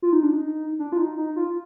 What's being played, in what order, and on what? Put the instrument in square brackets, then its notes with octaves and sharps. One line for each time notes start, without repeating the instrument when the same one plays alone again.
[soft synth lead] F4
D#4
D4
D#4
D4
F4
D#4
D#4
F4